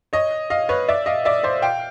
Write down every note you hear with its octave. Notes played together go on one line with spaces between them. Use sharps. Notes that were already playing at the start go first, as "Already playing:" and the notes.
C#5 D#5
D#5 F5
B4 C#5
D5 E5
D#5 F5
D5 E5
C5 D5
F5 G5